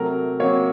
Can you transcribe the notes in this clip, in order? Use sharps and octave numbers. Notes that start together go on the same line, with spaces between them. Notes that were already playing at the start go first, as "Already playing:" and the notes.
Already playing: C3 F#3 A3 A#4
C3 F#3 A#3 C#5